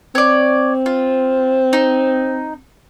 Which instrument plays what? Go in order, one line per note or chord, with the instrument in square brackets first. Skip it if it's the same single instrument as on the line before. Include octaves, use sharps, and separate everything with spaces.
[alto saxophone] C4 [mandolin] C#5 D5
[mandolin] F4
D#4